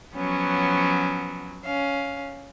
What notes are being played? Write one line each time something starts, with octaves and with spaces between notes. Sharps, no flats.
F3 F#3 B3 C#4
C#4 F5